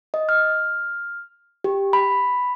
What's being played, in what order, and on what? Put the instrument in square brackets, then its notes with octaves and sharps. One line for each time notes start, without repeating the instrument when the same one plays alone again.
[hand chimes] D#5
F6
G4
B5